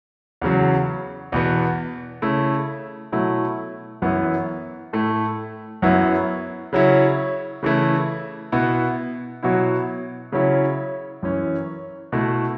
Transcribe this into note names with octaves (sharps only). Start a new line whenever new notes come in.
E2 C#3 F#3
E2 B2 B3
C#3 A3 E4
B2 F#3 A3 E4
F#2 E3 B3 E4
A2 A3 E4
F#2 F#3 B3 E4
C#3 F#3 C#4 E4
C#3 E3 A3 E4
B2 B3 E4
B2 F#3 B3 E4
C#3 F#3 C#4 E4
F#2 E3 C#4
B2 A3 E4